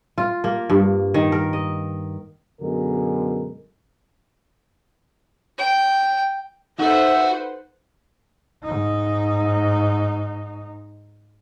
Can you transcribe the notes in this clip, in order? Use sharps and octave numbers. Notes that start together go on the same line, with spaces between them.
F4
A#3
G2
D#3
A#4
D#5
F#2 B2 D3 G#3 A#4
G5
D#4 F#4 A4 B4 C5 E5 F#5 A6
G#2 D#4